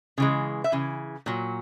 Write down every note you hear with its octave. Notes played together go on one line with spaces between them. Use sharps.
C#3 E3 G#3
E5
C#3 E3
A#2 F#3